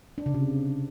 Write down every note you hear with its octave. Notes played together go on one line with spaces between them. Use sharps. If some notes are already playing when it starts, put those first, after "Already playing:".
D4
C#3
C3